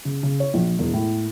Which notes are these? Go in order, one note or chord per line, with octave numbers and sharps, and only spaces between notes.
C#3
C#3
C#5
A#1
E1
A2